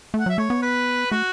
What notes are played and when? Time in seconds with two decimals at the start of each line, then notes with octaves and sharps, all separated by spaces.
0.14 A3
0.20 F#5
0.26 F#3 E5
0.38 A3 C#5
0.50 B3
0.62 B4
1.11 A3 F#4